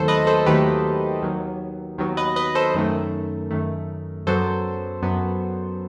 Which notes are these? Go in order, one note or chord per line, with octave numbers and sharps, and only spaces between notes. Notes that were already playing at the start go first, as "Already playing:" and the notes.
Already playing: D#2 D#3 F#3 A3 A4 C5
B4 D#5
A4 C5
D#2 D#3 F#3 A3 G4 B4
D#2 D#3 F#3 B3
D#2 D#3 F#3 B3
B4 D#5
B4 D#5
A4 C5
F#2 D#3 A3
F#2 D#3 A3
F#2 F#3 B3 A4 C5
F#2 F#3 B3